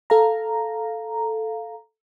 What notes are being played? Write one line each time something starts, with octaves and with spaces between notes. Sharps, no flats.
A4 F5 A#5